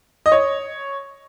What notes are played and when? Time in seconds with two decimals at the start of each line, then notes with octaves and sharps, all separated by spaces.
0.26 D#5
0.32 C#5